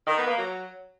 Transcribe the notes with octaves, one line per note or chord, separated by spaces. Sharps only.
D#3
B3
A#3
F#3